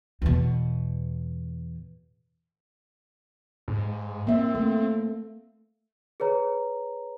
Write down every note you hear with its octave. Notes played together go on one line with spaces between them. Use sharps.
E2 B2
G#2
A#3 C4 E5
A3
G#4 B4 C#5 A#5